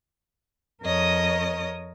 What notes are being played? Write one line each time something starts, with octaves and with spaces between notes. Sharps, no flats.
F2 A#4 C#5 D#5 D#6